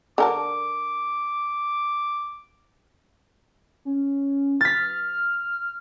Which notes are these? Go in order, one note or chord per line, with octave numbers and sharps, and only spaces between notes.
D3 A#4 A5 D6
C#4
F6 A6 B6